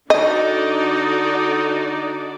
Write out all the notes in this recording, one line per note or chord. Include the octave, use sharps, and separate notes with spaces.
D3 D#4 F#4 D5 D#5